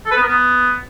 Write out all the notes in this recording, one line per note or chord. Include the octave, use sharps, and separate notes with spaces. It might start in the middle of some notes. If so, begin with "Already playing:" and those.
A4
B4
B3
A#4
B3